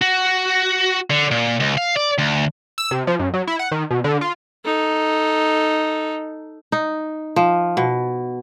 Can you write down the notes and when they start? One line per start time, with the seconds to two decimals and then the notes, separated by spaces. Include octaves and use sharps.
0.02 F#4
1.10 D3
1.31 A#2
1.60 C#2
1.78 F5
1.97 D5
2.18 D2
2.78 E6
2.91 C3
3.07 F3
3.19 F#2
3.34 F#3
3.47 E4
3.59 F#5
3.72 D#3
3.91 B2
4.04 D3
4.21 F4
4.65 D#4 A4
6.72 D#4
7.36 F3
7.77 B2